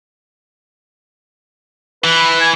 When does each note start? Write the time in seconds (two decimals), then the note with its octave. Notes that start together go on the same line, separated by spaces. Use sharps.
2.04 E3 B4
2.41 G#5